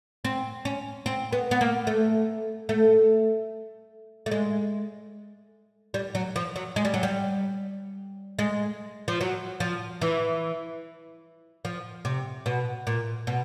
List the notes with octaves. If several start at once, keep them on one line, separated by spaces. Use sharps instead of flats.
C4
C#4
C4
B3
B3
A#3
A3
A3
A3
G#3
G3
F#3
F3
F#3
G#3
G3
F#3
G3
G#3
F3
F#3
F3
E3
F3
C3
B2
A#2
B2